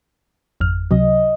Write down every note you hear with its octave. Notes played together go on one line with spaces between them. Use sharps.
G#1 F2 F6
C#2 C3 F#3 D#5